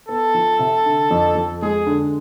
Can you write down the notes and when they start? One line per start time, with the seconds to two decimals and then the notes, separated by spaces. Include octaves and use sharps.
0.08 B3 A4
0.34 F3
0.59 C3
0.85 D3
1.11 F2
1.36 F2
1.62 G#3 G#4
1.87 D3